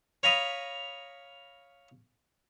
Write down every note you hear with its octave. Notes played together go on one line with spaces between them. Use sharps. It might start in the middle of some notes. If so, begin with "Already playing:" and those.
C#5 F5 A#5 B5 D#6